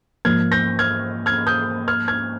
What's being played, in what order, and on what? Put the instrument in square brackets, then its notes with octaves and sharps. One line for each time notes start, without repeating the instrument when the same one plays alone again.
[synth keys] G#2 F3 A#3 [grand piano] F6 G#6
[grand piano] G6 A#6
F6 G#6
F6 G#6
D#6 G6
F6 G#6
F6 G#6